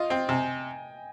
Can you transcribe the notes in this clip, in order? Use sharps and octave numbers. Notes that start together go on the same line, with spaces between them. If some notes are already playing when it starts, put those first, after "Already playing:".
Already playing: F4 D#5
C4 G5
C3 G#5